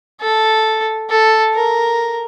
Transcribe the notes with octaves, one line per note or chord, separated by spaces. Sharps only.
A4
A4
A#4